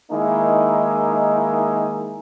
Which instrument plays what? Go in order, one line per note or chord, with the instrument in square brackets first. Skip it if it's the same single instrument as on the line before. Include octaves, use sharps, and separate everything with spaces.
[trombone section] D#3 G#3 A#3 D#4 E4